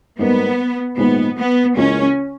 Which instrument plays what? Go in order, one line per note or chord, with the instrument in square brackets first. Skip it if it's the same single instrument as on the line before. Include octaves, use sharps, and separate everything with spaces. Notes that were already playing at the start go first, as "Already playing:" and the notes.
[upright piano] G#2 G3 A#3 [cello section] B3
[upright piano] A#1 G#2 D#3 G#3 [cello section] B3
[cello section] B3
[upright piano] C#2 C#3 E3 A#3 [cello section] C#4